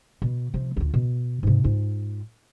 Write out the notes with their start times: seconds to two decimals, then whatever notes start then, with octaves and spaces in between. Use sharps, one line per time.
0.22 B2
0.54 C3 F3
0.77 D2 F4
0.94 B2
1.43 G#2 C3
1.64 G#2 F4